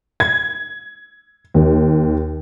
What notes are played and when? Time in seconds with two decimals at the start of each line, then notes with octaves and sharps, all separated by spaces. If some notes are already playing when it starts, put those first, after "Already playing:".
0.20 G#6
1.54 D#2